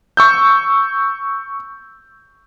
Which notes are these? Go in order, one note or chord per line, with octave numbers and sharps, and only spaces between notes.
C#6 E6 G6